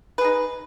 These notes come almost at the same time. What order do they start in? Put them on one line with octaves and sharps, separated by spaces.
B4 G#4 D#4